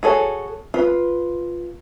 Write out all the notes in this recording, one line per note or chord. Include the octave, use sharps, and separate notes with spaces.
F#4 G#4 A4 C#5
F4 B4